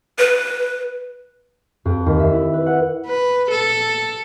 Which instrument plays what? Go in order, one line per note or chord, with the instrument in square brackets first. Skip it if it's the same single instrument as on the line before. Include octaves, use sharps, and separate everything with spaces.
[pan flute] B4
[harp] F2
D#2
E5
E4
B4
F#5
[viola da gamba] B4
A4